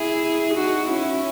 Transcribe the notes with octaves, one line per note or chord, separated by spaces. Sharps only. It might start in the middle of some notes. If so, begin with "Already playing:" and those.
Already playing: E4 G#4
D#4 F#4
C#4 E4